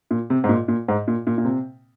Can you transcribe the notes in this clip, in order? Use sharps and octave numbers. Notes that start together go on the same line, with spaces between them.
A#2
C3
G#2
A#2
A#2
G#2
A#2
A#2
A#2
C3